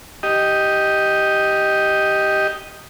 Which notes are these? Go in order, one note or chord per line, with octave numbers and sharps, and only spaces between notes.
G4 D#5